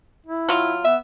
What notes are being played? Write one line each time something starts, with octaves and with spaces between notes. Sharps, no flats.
E4
F#3 F4
B3 E5